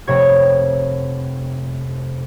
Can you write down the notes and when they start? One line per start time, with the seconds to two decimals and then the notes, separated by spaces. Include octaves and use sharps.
0.07 F1 C3 B4 C#5 G#6